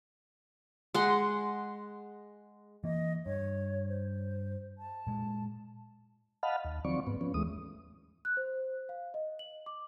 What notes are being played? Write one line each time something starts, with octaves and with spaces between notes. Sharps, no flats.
G#3 F#5 C6
E3 A#3 D#5
G2 C#5
C5
A5
A#2 G#3
D#5 F5 F#5 A5 B5 F6
D#2
D#3 F3 F#3 C4 D5 C#6
G#2 B3
F3 B3 C#4
D#2 E3 G#3 A3 D#6
F#6
C5
F5
D#5
F#7
D6